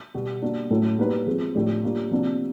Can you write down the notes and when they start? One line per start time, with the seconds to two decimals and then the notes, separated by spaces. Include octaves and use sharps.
0.14 B2 G3 B3
0.42 G3 A#3 D4 F#4
0.70 A2 F#3 A3 C#4 E4
0.98 G3 A#3 D#4 F#4 B4
1.27 F3 G#3 C4
1.55 A2 F3 A3 D4 G4
1.83 G3 A#3 D4 F4
2.11 C3 F3 A#3 D4 F#4